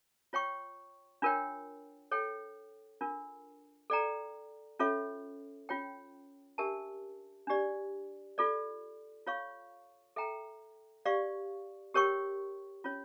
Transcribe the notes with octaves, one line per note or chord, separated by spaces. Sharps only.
F4 C#5 G5 C#6
D4 F4 A#4 C#5 G5
A4 C#5 G5
D4 F4 A#4
A4 D5 G5 A#5
C#4 F4 A4 C#5 E5
C#4 F4 C#5 G5
D4 G4 A#4 E5 A5
D4 G4 D5
F4 A4 D5
F4 C#5 F5 C#6
A4 E5 G5 A#5
G4 D5 F5 C#6
G4 A#4 C#5 G5 C#6
C#4 F4 C#5